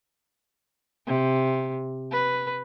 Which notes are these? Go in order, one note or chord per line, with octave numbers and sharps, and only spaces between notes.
C3
B4